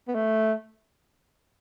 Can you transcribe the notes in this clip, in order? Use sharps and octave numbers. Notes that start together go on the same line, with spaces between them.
B3
A3